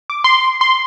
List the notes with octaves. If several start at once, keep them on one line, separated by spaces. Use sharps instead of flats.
D6
C6
C6